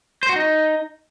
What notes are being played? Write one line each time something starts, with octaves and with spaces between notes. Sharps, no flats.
C5
F#4
D#4